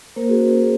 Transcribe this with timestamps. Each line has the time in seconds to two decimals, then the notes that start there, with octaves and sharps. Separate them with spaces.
0.16 A#3 A#4 C5
0.29 F#4 G#4
0.34 C#4
0.53 F#4 G#4 A#4